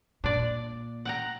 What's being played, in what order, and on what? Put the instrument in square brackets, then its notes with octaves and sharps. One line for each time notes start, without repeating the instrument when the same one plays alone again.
[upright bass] A#2 [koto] D4 D5
[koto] F#5 G5 A#5